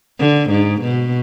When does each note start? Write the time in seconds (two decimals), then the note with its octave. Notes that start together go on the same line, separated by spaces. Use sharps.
0.19 D3
0.50 G#2
0.81 B2